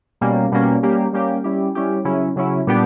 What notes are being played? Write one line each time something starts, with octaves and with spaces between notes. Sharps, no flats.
B2 G3 A#3 C#4
B2 G3 A#3 C#4
G3 A#3 C#4 G4
G3 A#3 C#4 G4
G3 C#4 E4 G4
G3 C#4 E4 G4
C#3 F#3 C#4 E4
C#3 F#3 C#4 E4
A#2 G3 B3 D4 G4